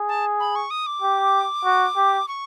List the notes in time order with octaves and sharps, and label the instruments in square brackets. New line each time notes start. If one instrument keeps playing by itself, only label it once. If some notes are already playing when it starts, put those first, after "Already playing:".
Already playing: [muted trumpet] G#4
[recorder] A5
B5
C#6
D#6
D6
[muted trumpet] G4
F#4
G4
[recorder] C#6